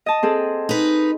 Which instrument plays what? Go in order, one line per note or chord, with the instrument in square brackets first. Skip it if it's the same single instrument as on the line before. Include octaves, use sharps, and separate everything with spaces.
[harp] D#5 A5
C4 G#4 A4
[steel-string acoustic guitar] D#4 B4